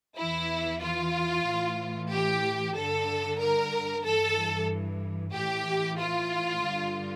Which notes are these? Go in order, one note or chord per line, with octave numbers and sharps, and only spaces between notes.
E2 E3 E4
F4
A2 E3
G4
G2 D3 A4
A#4
G2 E3 A4
A2 E3 G4
F4
G2 D3